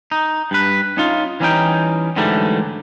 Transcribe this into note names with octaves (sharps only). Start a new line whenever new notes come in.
D#4
G2 B4
C#4 D#4 F4
E3 G3 C#4 D#4 G5
G#2 D3 E3 F#3 G3 A3